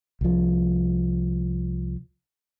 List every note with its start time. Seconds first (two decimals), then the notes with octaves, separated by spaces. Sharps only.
0.21 C2 F3